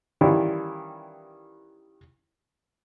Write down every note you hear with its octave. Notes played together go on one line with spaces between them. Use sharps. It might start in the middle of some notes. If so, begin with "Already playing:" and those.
D#3 E3 G3 C#4 E4 F4